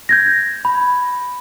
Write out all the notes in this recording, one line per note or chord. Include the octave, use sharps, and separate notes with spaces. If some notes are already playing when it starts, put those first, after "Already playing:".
G6 G#6 A#6
B5